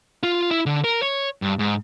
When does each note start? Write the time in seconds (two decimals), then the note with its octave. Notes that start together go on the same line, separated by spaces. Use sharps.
0.23 F4
0.51 E4
0.66 D3
0.84 A#4
1.02 C#5
1.42 G2
1.59 G#2